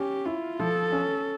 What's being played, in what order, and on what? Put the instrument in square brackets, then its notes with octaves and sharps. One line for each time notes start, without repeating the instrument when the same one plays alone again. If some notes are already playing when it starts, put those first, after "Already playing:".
Already playing: [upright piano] C#4 [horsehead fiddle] G4
[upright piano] E4 [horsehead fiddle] F4
[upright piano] F3 [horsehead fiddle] A4
[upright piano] C#4